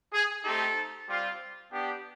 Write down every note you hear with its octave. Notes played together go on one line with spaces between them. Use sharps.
G#4
A3 C4 D#4 G4 A4
G3 C4 F4
B3 D4 G4